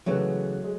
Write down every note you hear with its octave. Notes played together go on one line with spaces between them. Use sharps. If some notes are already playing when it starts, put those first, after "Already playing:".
C#3 E3 F#3 G#3 A3 B3
G#3